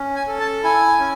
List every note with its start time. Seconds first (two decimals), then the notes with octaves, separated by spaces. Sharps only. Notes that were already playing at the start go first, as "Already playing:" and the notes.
Already playing: C#4
0.16 G#5
0.28 A4
0.40 A5
0.64 E4 G#5
1.00 C#4